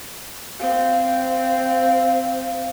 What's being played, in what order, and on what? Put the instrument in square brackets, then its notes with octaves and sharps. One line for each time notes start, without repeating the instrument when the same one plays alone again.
[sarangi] C4 [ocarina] F5